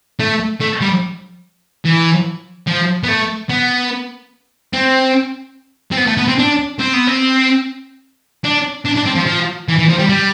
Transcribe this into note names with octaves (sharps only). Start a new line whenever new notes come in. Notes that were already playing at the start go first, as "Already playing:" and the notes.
A3
A3
G3
E3
F3
B3
A3
B3
C4
C4
B3
A3
B3
C4
D4
C4
B3
C4
D4
D4
D4
C4
F3
F3
E3
E3
F3
G3
G3